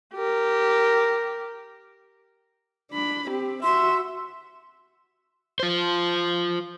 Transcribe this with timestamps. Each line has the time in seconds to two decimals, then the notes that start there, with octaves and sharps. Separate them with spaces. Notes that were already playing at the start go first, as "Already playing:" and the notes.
0.14 G4 A#4
2.92 D4 B5
3.29 C4 G4
3.63 F#4 E5 C6
5.60 F4 C5